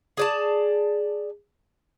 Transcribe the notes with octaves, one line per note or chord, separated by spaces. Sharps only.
G#4 D5 A5